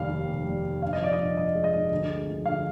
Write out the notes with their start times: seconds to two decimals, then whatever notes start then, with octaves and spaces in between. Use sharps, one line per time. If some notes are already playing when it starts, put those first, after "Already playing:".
Already playing: F1 D#2 G3 F5
0.10 G3
0.28 F1
0.47 G3
0.64 F1
0.82 G2 F5
0.93 D#5
1.00 F3 D5
1.13 D#5
1.19 G2
1.37 G2 D#5
1.55 G#3
1.64 D#5
1.73 G2
1.91 D2
2.09 G#3
2.27 F3
2.45 D2 F5